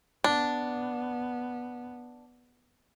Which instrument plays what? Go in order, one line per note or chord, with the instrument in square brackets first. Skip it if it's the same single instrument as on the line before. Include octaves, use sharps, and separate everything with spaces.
[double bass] B3 [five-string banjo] D4